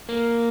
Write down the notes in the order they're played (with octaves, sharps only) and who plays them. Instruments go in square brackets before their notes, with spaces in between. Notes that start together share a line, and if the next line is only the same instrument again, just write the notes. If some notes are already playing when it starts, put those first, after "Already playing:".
[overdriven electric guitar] A#3